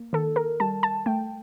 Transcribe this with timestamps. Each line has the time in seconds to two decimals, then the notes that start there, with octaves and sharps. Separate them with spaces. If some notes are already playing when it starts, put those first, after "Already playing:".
Already playing: A#3
0.13 D#3 A4
0.36 A#4
0.60 G3 A5
0.83 A5
1.06 A3 G5